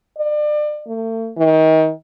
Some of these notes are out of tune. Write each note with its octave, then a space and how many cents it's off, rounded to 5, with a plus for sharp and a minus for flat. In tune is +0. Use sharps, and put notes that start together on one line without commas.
D5 +35
A3 +40
D#3 +30